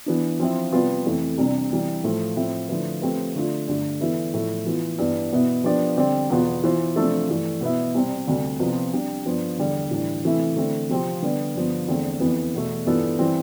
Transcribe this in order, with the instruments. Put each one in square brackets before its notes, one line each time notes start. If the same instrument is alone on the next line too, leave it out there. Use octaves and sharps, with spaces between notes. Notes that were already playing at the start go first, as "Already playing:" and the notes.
[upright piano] E3 B3 D4
F3 C4 E4
C3 G3 B3 F4 B4
F2 C3 E3 A3
C2 C3 G3 D4
C3 E3 G3
A2 F3 A3
A2 F3 C4 E4
D3 F3 A3 E4 B4
F3 A3 C4 G4 B4
D3 A3 D4 F4
G2 D3 A3
E3 B3 E4 A4
A2 F3 A3 E4
E3 B3 F4
G2 E3 B3
B2 B3 E4
F3 B3 D4 G4 D5
D3 G3 C4 G4 D5
E2 B2 B3 F4
E3 B3 F4 C5
C3 F3 A3 D4 A4
G2 E3 A3
B2 B3 E4
C2 C3 G3 C4
D2 C3 G3
C2 C3 F3 B3 F4
C3 G3 D4 G4
G2 F3 B3 D4
E2 D3 G3
A2 E3 G3 D4
C3 E3 A3 E4
D3 A3 C4 E4
C3 F3 C4 G4
D3 G3 B3
G2 D3 F3 B3
E2 D3 A3 C4
F2 E3 B3
E2 B2 A3
G2 E3 B3 F4 A4
E3 G3 C4